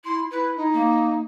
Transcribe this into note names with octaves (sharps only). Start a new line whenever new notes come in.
E4 C6
E4 B4
D#4
A#3